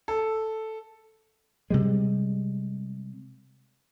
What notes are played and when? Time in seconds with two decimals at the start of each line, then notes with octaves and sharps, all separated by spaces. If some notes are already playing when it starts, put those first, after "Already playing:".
0.08 A4
1.70 C3 G3 G#3